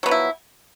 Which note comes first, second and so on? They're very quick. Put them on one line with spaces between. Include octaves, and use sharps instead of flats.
F#3 B3 F3 E4